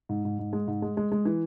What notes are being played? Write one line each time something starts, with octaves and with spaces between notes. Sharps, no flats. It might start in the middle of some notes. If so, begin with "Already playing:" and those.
G#2
G#2
G#2
G#3
G#2
G#3
G#3
G#3
E3